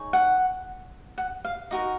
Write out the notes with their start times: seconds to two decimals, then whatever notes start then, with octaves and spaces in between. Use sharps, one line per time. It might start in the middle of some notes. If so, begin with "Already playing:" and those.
Already playing: D#4 G#4 C#5
0.13 F#5
1.18 F#5
1.45 F5
1.71 D#4 F#4 A#4 D#5